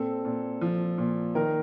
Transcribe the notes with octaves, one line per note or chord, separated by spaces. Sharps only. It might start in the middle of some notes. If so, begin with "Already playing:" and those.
Already playing: A#2 C4 A4
A#2
F3
A#2
D#3 A#4